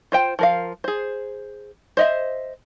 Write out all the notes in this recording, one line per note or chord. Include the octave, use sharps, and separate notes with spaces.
F4 C5 G5
F3 A#4 F5
G#4 C5
C5 D#5 E5